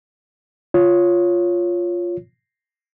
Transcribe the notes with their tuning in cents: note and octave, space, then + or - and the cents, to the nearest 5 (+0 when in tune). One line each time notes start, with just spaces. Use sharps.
F4 +0 C#5 +0